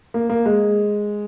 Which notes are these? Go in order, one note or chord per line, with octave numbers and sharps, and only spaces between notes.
A#3
A#3
G#3